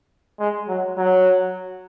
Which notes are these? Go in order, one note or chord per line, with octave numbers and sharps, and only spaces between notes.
G#3
F#3
F#3